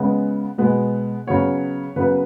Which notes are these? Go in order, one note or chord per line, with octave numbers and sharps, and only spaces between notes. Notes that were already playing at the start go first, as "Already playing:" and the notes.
Already playing: C#3 G#3 B3
B2 G#3 B3
C#3 F#3 B3 C#5
C#3 F#3 B3 B4